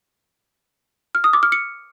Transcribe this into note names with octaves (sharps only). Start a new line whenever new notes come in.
F6
D#6
D6
F6
C#7